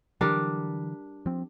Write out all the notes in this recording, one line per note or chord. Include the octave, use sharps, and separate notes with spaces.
D3 E3 F#3 G3 D4 A#4
F3 C4